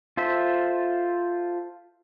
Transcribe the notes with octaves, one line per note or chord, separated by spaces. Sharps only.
F4 A4 C5 E5